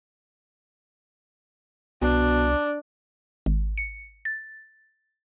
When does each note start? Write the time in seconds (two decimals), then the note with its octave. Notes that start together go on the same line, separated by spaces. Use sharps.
2.02 C2 B2 D4
3.46 G#1
3.78 C#7
4.25 A6